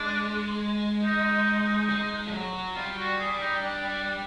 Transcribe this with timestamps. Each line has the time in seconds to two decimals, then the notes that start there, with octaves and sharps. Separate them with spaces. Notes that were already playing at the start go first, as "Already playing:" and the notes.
Already playing: G#3 D4
1.03 D#4
1.89 G#3
2.26 F3
2.32 F#3
2.75 G3 F4
2.97 F#4
3.19 G#4
3.40 D#4
3.62 D4